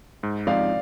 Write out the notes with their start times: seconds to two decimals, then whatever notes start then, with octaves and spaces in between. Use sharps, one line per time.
0.23 G#2
0.47 F3 G#3 C4 D#4 D5 F5